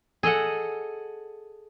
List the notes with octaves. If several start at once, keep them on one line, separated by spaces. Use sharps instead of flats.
G#4 A4 D#5 F#5